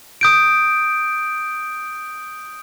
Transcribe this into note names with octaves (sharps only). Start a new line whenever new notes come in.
D#6 G6 D7